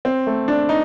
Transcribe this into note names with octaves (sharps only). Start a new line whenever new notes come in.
C4
A3
D4
D#4